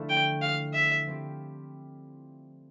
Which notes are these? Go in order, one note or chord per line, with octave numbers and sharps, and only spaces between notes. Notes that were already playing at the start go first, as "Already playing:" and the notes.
Already playing: D3 F3 A3 E4
G5
F5
E5
F3 C4 E4 G4